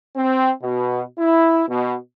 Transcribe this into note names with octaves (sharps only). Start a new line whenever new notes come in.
C4
B2
E4
B2